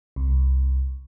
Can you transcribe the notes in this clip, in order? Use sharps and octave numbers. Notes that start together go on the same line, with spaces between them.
C2